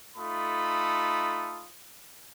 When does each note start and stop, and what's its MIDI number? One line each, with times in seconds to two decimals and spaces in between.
0.16 1.67 57
0.16 1.67 63
0.16 1.67 65
0.16 1.67 69
0.16 1.67 83
0.16 1.67 87